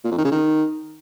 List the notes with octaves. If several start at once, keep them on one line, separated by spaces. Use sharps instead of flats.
A#2
F2
D#3
C#3
D#3